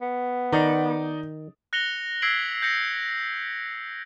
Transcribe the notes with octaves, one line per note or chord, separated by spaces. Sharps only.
B3
D#3 D#4 D5 A#5
F#6 A#6 C#7 F7 G7
E6 G#6 B6 C7 D7 F#7
G6 A#6 C#7